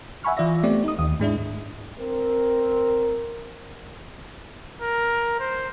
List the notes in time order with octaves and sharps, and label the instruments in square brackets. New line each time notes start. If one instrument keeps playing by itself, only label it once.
[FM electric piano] E5 F#5 G#5 B5 C#6 F6
E3 F4 D5 E5 A#6
A3 B3 C4 G4 D5
D#4 D#6
D#2 D#6
G#2 G#3 D4 E4
[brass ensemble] C4 A#4
[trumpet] A#4
C5